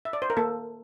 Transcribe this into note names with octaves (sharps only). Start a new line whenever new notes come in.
E5
D5
C5
A#4
A#3 A4